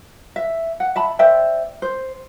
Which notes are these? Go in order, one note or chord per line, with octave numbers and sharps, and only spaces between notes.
E5
F#5
E5 A5 B5
C5 D5 E5 G5
C5